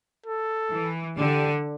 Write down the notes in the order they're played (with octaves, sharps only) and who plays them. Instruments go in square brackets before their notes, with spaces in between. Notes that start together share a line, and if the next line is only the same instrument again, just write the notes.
[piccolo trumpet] A4
[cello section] E3
[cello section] D3 [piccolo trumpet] G4